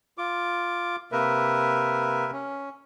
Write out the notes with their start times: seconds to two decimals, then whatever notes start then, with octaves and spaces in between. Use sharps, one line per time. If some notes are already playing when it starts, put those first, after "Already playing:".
0.18 F4 D6
1.12 C3 A#3 A#4 B4 E5
2.33 C#4